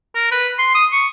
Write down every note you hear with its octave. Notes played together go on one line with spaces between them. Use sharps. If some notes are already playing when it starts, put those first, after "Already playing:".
A#4
B4
C6
D#6
C#6